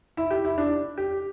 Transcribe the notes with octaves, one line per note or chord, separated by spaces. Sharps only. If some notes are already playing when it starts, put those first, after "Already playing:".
E4
G4
E4
D4
G4